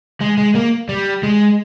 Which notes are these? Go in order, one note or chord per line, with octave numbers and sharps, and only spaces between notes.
G#3
G#3
A#3
G3
G#3